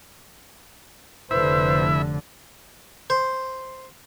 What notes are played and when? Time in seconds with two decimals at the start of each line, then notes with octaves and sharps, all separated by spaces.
1.31 F1 D3 E4 B4 C5 E5
3.10 C5